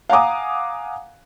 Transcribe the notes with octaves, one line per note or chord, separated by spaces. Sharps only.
F5 F#5 G#5 A#5 D6 D#6